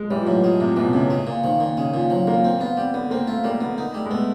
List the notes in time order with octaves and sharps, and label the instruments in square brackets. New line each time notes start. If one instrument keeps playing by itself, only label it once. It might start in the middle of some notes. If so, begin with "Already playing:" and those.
Already playing: [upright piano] G#3
[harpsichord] E3 [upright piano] G3
[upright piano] F3
[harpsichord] A2 [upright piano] F#3
[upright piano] F3 [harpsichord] G#3
[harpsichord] A2 [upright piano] C3
[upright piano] B2 [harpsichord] E3
[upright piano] C3
[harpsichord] A2 [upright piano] C#3
[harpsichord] G#3
A#2
[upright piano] D#3 [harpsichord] F3
[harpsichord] A#2
[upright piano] C#3 [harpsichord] G#3
[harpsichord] A#2 [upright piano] F3
[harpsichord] F3 [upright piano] F#3
[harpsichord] A#2 [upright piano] A#3
[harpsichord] C4
[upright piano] B3 [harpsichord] F4
[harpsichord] G3 [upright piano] C4
[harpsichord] D3 [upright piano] B3
[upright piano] A#3 [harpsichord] C4
[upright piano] A3 [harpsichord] F4
[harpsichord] G3 [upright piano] A#3
[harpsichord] D3 [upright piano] B3
[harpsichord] D#4
[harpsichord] G3 [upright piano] A3
[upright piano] G#3
[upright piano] A3 [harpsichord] B3